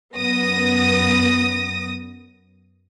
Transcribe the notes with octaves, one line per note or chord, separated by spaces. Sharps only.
F#2 B3 D#6 A#6